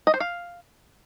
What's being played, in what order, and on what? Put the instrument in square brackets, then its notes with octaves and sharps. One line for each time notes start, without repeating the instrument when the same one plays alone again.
[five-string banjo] D#5
C5
F5